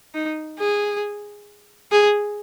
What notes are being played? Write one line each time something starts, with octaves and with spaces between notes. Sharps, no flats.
D#4
G#4
G#4